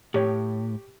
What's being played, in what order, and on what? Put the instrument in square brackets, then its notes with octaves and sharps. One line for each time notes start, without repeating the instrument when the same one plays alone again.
[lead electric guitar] A2 [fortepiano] G4 C#5